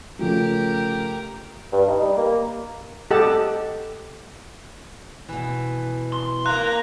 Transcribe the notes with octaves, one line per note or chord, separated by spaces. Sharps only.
C#3 F3 A3 G4 A#4
G2
D#4
G3
A#3
G4 A4 D#5 F#5 A5
B2 E3
C6
A#4 F5 A#5 F#6